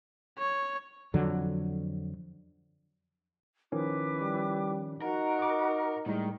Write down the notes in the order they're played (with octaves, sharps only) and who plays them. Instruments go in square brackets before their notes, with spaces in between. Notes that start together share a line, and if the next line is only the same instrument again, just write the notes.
[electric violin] C#5
[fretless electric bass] F2 D3 F#3
[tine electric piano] D#3 F3 C#4 [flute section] E4 B4 D6
[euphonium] G3
[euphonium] D#4 [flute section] F#4 F#5 A#5 [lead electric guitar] A#4
[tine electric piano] D#5 D6
[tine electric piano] A2 G3 G#3 [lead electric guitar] D#3